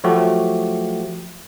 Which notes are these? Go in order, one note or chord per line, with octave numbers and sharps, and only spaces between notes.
F3 F#3 A3 F#4 G4